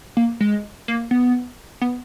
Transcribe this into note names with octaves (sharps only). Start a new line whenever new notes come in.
A#3
G#3
A#3
B3
B3